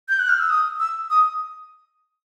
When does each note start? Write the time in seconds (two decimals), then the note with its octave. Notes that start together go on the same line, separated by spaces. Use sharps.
0.09 G6
0.19 F#6
0.29 F6
0.39 E6
0.50 D#6
0.80 E6
1.10 D#6